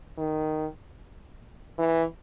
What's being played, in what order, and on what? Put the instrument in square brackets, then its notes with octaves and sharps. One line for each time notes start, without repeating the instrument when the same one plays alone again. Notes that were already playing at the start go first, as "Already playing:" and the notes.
[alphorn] D#3
E3